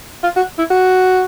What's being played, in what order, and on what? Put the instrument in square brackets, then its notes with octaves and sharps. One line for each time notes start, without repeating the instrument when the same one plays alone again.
[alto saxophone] F4
F#4
E4
F#4